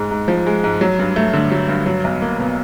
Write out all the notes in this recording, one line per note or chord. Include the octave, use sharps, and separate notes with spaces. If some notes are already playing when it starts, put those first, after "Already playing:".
Already playing: G#2 G#3
G#2
F3
G#3
G#2
F#3
G2
A3
D3
F#3
G2
F#3
B1
A#3
B2